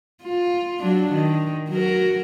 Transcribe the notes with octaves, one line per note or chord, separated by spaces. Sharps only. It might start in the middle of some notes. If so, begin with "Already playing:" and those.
F4
F#3 D4
D#3
F#3 F#4 A#4